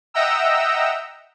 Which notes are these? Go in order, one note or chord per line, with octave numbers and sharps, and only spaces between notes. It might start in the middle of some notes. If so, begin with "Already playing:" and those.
D#5 E5 F#5 G5 A#5 E6